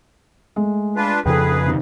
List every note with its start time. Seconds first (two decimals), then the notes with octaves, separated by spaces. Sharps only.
0.56 G#3 A3
0.96 D4 F4 B4
1.26 F2 C#3 F3 G#4 A4 B4 G5
1.66 C3 D#3